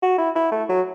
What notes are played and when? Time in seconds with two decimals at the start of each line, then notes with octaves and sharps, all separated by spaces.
0.02 F#4
0.18 E4
0.36 E4
0.52 A3
0.69 F#3